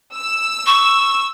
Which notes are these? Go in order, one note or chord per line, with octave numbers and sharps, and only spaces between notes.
E6
C#6